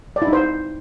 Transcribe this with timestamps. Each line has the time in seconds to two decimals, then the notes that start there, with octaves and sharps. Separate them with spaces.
0.16 D5
0.22 E4
0.27 D#4
0.33 C5